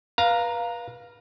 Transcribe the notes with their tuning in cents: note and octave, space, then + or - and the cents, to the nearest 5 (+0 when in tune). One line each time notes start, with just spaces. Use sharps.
B4 -30 F5 +0 A#5 +0